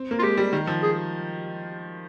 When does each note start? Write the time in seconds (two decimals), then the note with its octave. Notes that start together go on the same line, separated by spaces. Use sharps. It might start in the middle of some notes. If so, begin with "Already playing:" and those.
Already playing: C4
0.11 A#3
0.19 F4
0.22 G#3 G4
0.37 G3
0.53 D#3
0.67 F3
0.82 G#4